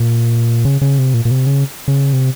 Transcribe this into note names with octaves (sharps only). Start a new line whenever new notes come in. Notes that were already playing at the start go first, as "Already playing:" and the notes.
Already playing: A#2
C#3
C#3
C3
A#2
A#2
C3
C#3
C#3
C3